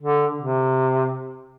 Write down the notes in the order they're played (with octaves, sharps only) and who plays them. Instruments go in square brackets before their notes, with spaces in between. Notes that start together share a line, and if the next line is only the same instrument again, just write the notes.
[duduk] D3
C3